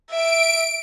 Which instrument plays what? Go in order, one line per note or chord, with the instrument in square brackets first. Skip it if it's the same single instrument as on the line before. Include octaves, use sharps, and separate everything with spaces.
[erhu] E5 [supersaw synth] D7